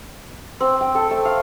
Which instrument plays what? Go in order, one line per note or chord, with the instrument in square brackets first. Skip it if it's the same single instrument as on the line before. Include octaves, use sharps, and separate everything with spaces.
[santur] C4
G5
A4
A3
F5